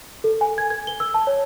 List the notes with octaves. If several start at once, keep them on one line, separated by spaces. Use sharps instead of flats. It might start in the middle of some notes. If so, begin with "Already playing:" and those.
A4
G#5
G#6
G#6
G7
E6
A5
C#5